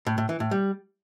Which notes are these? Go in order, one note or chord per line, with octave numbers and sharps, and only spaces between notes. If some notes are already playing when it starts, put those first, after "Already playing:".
A2
A2
E3
A2
G3